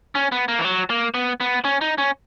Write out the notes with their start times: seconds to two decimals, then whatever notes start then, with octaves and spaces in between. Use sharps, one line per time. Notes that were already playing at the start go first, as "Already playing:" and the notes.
0.15 C#4
0.32 B3
0.48 A#3
0.59 E3
0.65 F#3
0.90 A#3
1.14 B3
1.40 B3
1.64 C#4
1.81 D#4
1.98 C#4